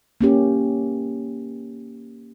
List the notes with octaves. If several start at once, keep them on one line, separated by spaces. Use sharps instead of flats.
A#3 C#4 G4